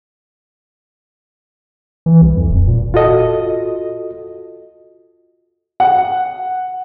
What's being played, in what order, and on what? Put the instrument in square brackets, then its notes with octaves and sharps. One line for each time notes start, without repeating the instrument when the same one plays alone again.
[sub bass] E3
C2
F2
D#1
A#2
[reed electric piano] F4 F#4 A4 D#5
[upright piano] F#5